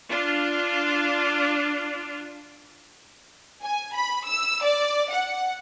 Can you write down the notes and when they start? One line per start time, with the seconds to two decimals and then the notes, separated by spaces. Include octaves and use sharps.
0.10 D4 F4
3.63 G#5
3.94 B5
4.26 E6
4.64 D5
5.11 F#5